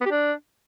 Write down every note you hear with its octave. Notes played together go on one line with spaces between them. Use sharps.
B3
G4
D4